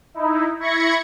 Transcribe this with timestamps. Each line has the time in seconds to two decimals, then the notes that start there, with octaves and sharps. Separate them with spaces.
0.14 D#4 E4
0.60 E4 B5 C#6 G#6 A#6 C#7